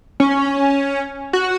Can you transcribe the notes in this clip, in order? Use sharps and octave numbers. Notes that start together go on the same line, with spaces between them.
C#4
F#4